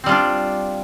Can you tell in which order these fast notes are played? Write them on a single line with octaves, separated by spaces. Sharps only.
C4 G3 F4 D4